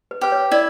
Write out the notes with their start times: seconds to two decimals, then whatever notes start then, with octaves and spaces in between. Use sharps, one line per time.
0.11 B4
0.21 G4 B4
0.32 C#5
0.51 E4 D5